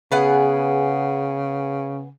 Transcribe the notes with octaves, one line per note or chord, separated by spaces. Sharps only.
C#3 B3 G#4 F#5